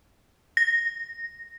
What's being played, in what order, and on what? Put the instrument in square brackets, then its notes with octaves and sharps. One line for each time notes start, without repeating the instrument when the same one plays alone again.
[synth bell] A#6